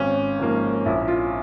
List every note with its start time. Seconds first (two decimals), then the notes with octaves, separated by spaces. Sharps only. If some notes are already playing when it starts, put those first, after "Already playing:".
Already playing: G#1 C#4
0.39 G#2 F3 A#3
0.86 A#1 E4
1.08 F4